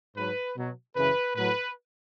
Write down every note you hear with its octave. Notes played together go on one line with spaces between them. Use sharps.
G#2 F#3 B4
B2 F#3
F#2 C#3 E3 B4
A2 F#3 B4